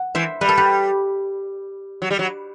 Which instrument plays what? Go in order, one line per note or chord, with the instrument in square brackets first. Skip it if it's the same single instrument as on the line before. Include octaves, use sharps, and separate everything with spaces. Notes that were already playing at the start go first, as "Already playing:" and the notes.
Already playing: [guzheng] F#5
[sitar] E3 [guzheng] C5 E5
[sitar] G3 [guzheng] B4
[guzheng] A4
G4 B4
[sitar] F#3
G3
F#3